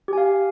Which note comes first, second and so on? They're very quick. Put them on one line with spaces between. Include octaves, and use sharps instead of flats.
G4 G#5 F5